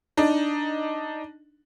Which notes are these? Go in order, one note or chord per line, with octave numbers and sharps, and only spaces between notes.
D4 D#4